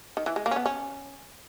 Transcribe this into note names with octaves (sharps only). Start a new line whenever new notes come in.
D#3
E3
G#3
A#3
C#4
B3
C#4